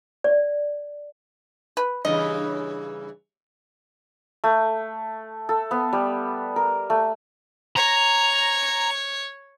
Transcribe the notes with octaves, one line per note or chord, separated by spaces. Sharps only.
D5
B4
G2 C#3 E3 D#5
A3
A4
B3
G3
A#4
A3
C#5 A#5